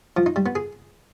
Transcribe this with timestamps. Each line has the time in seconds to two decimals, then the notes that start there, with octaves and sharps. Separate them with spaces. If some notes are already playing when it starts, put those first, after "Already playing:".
0.17 F3
0.26 D#4
0.36 G3
0.46 B3
0.55 G#4